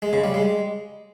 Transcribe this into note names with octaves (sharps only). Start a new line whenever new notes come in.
G#3
C#3
G3
G#3